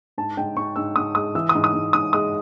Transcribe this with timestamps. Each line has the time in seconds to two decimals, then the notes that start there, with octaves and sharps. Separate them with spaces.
0.18 G#2 A5
0.37 G#2 G5
0.56 G#2 C#6
0.76 G#2 E6
0.96 G#2 D#6
1.15 G#3 D#6
1.35 E3 E6
1.49 D#6
1.55 G#2
1.64 D#6
1.74 G#2
1.93 G#2 D#6
2.13 G#3 D#6